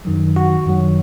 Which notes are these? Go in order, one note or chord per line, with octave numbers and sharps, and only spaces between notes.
F#2 D#3 F#3
F#4
F#2 D#3 F#3